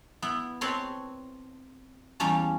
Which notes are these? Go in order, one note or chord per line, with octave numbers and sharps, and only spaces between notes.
B3 E4
C4 B4 C#5 A5 C6
E2 G3 A#3 C#4 C#5 A5